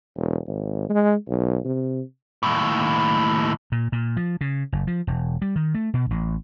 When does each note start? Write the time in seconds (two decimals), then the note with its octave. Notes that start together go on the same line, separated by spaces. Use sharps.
0.16 E1
0.47 G#1
0.89 G#3
1.28 B1
1.65 C3
2.43 D#2 A2
3.72 A#2
3.92 A#2
4.17 F3
4.41 C#3
4.72 F#1
4.87 F3
5.07 E1
5.42 G3
5.56 D#3
5.74 A3
5.94 B2
6.11 A1